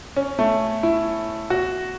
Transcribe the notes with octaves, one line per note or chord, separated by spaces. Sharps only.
C#4
A3
E4
F#4